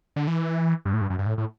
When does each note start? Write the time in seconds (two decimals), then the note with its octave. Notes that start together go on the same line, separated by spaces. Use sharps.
0.16 D3
0.27 E3
0.85 G2
0.93 A2
1.01 G2
1.10 F#2
1.19 G2
1.26 A2
1.38 A2